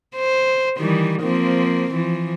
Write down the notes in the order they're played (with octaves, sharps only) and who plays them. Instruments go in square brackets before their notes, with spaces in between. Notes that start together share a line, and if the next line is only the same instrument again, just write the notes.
[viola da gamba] C5
D#3 E3 G3
F3 A#3 C4
E3 F3